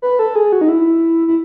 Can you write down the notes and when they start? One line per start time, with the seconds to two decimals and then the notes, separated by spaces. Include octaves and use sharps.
0.02 B4
0.19 A4
0.36 G#4
0.52 F#4
0.61 D#4
0.69 E4
1.28 E4